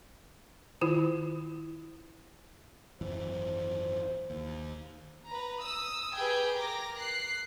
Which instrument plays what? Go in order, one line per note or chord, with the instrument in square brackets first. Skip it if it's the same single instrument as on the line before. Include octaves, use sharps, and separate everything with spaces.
[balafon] D#3 E4 F4
[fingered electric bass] G#1 F#2 E3 [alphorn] C5
[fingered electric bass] D#2
[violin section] B4 A#5
D#6 E6
G4 G#4 B4 G5 G#5
A#4 A#5 D6 A#6
F#6 C7